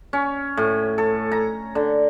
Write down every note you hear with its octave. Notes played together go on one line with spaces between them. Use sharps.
C#4
A2
A4
A#5
D3